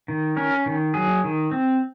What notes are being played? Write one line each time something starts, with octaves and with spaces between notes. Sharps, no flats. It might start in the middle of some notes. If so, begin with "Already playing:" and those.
D#3
C#4 A#4
D#3
F#3 G#4
D#3
C4